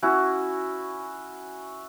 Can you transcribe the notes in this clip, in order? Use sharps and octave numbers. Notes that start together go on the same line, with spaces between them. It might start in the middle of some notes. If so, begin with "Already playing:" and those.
C#4 E4 F#4